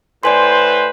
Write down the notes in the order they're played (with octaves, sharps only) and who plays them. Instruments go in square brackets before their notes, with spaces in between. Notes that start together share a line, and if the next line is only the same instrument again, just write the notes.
[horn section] A2 B4 C5 [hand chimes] D5 G#5 C6